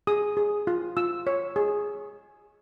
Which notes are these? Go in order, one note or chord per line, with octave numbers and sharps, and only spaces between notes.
G#4 D#6
G#4
F4
F4 E6
C#5
G#4